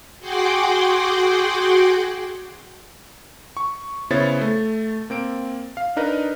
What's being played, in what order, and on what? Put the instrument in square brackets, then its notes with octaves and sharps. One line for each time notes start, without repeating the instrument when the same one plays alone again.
[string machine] F#4 G#4 F#5 G5 C6 D6
[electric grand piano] C#6
C#3 B3 E4 C5 C#5 A6
A3
A#3 C4 D7
F5
D4 D#4 A#4 B4 D#5